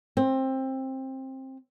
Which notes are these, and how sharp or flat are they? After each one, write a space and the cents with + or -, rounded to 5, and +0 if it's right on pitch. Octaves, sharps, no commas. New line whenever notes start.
C4 +20